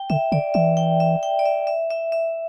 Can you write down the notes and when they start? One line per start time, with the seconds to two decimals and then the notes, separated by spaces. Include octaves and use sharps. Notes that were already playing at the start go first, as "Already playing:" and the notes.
Already playing: G5
0.10 D3 E5
0.32 D3 D5
0.54 E3 E5
0.77 G5
1.00 E5
1.23 G5
1.39 D5
1.45 E5
1.67 E5
1.90 E5
2.12 E5